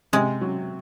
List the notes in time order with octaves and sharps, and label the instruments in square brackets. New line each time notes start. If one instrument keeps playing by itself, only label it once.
[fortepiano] C3 [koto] G#3
[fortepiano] F#3